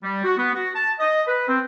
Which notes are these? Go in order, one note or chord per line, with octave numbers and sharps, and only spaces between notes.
G3
F#4
B3
F#4
A5
D#5
B4
C4